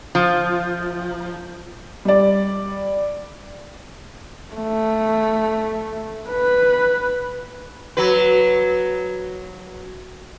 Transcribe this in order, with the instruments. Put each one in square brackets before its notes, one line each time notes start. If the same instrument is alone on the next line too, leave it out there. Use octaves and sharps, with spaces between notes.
[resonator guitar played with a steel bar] F3
[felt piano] G3 D5
[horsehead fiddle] A3
B4
[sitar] F#3 B4